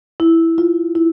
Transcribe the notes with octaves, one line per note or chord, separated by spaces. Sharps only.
E4
F4
E4